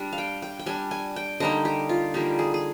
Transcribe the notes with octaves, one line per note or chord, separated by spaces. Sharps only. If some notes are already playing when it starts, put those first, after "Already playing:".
Already playing: G3 D4
F5
G5
G5
G5
G3 D4 G#5
G#5
G5
D3 G3 A#3 D#4 D#5
G4
F4
D3 G3 A#3 D#4 G4
G#4
G#4